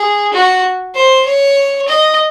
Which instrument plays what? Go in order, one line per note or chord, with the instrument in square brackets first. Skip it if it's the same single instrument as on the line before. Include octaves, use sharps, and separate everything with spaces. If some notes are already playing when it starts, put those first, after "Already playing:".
Already playing: [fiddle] G#4
F#4
C5
C#5
D#5